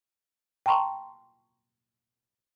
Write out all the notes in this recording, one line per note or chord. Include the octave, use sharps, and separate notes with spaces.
G5 A5 A#5 C6 C#6